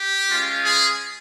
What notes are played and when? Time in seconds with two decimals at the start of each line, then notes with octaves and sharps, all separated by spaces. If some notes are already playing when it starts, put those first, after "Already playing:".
Already playing: G4
0.28 G#3 C#4 F4
0.63 G#4